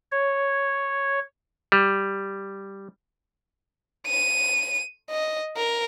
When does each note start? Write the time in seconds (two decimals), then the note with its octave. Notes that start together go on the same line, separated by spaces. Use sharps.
0.12 C#5
1.72 G3
4.07 D#7
5.10 D#5
5.57 A#4